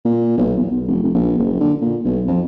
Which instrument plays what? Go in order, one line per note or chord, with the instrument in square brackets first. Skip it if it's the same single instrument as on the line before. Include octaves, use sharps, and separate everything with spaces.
[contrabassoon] A#2
B1
E2
B1
F1
F1
A#1
F#1
D3
A#2
B1
F2